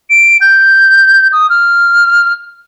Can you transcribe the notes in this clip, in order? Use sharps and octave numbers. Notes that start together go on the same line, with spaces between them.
D7
G6
D#6
F6